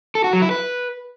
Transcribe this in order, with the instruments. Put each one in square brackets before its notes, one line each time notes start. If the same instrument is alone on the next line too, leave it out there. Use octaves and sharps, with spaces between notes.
[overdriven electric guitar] A4
F#4
F#3
E4
B4